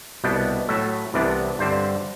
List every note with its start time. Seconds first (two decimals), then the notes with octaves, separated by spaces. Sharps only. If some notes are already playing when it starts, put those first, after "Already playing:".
0.24 C2 B2 G3 B3 D4 G5
0.68 A2 F#3 A3 E5
1.14 C2 C3 E3 B3 D4 D5
1.59 G2 D3 G3 C4 C5